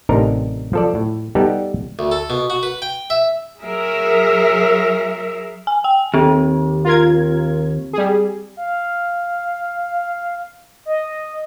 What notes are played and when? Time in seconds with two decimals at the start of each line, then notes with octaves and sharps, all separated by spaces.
0.09 A1 C3 D4 D#4 A#4 A#5
0.73 F3 A4 D5
0.95 A2
1.35 G3 B3 D#4 G4 A4 D5
1.99 D2
2.12 A4
2.30 B2
2.50 F#4
2.63 B4
2.82 G5
3.10 E5
3.60 F#3 G#4 A#4 E5
5.67 G#5
5.84 G5
6.14 D#2 C4 G4
6.85 F4 A#4 G#6
7.93 G3 G#4
8.57 F5
10.85 D#5